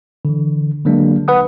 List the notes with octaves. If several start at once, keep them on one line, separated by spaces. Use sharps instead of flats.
D3 E3
D3 F#3 G#3 A#3 D4
B4 F#5 D#6